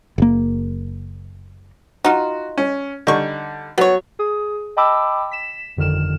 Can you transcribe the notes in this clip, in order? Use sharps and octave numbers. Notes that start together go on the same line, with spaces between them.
F#1 A#3
D#4 F4 F#4
C#4
D3 G3 D#4 C#6
F#3 B3 C#5
G#4 D#6
D#5 G5 A5 B5 D6 E6
B6 E7
G1 F2 D3 D#3 F6 E7